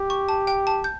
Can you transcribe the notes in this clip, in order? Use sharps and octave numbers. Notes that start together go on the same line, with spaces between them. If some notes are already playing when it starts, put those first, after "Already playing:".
Already playing: G4
C#6
A5
G5
A5
G6